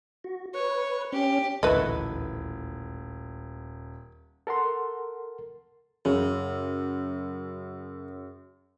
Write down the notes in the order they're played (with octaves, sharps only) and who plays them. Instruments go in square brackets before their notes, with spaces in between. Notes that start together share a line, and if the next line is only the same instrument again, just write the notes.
[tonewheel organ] F#4
[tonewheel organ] B4 [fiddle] C#5
[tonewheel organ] C#4 [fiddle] G4
[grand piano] D#1 [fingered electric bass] A1 D2 [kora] A3 E4 F#4 [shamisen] B4 D#5
[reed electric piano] A4 A#4 F#5 C6
[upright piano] F#2 [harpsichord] C#3